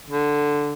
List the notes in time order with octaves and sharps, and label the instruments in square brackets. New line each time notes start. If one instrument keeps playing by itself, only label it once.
[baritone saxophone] D3